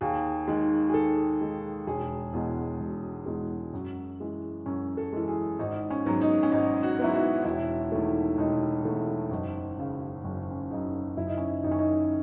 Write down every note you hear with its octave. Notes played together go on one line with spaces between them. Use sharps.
D#2 G#4
D#3 G#3
G#4
D#2 A4
D#3 G#3
E1 G#4
E2 B2 G#3
E1
E2 B2 G#3
F#2 F#4
E3 G#3
F#2 C#4
A4
E3 G#3
G#4
G#1 D#4
C#4
G#2 F#3 B3
D#4
C#4
G#1 D#4
F#4
G#2 F#3 B3 E4
F#4
E1 E4
E2 D#3 A3
E1 D#4
E2 D#3 A3
F#1 D#4
F#2 C#3
F#1 C#4
C#4
F#2 C#3 D#4
F#1 E4
D#4
C#4
D#4
F#2 D#3 D#4
C#4
D#4